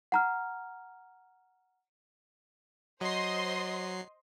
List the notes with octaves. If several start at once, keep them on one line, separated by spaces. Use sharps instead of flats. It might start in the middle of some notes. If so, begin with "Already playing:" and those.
F#5 A#5 F6
F#3 C5 D#5 C6 C7